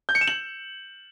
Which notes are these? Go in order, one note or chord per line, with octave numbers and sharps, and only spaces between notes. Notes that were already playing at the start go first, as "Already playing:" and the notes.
G6
C#7
E7
F#7